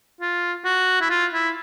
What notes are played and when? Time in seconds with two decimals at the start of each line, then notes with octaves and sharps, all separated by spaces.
0.21 F4
0.65 F#4
1.01 E4
1.10 F4
1.33 E4